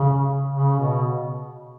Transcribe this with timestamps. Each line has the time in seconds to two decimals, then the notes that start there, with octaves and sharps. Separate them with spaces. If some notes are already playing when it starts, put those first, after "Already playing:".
Already playing: C#3
0.55 C#3
0.79 B2